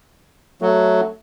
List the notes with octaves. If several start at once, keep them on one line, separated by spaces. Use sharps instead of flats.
F#3 A3